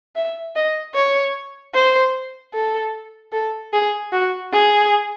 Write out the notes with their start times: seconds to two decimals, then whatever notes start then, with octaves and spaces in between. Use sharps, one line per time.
0.16 E5
0.56 D#5
0.95 C#5
1.74 C5
2.54 A4
3.33 A4
3.73 G#4
4.12 F#4
4.53 G#4